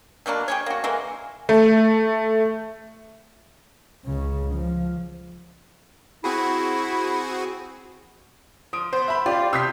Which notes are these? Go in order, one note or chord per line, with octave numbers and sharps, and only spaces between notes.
B2 F#3 A#3 D4
G4 G#4 C#5
A#3 F#4
E3 G#3 A#3
A3
C#2 C#3
F3
C4 E4 F#4 G#4
F3 D#6 D7
B3 C5
E5 B5
F4 G4 D5
C3 D#6 E6 G6 B6 C7